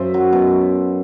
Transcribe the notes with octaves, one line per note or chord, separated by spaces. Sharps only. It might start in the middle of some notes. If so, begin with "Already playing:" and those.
Already playing: F#2 C5 E5
F#3
B2